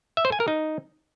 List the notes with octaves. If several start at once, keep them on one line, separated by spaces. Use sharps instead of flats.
E5
C5
G#5
A#4
D#4